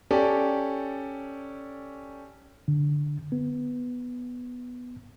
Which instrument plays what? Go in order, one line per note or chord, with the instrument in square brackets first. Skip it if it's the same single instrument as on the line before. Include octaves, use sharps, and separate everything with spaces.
[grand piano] C#4 G4 A4 D5
[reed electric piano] D3
B3